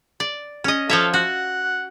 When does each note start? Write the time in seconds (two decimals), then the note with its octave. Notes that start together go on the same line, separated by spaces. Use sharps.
0.20 D5
0.64 C#4 D#5
0.90 F3 A4 C#5 E5 F5
1.14 F#4 F#5